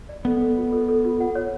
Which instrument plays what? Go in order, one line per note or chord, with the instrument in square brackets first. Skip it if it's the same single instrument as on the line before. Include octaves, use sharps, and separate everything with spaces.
[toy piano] D5
[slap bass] B3 [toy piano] A4
[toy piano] A4
F4
A4
A4
F4
F#5
C#5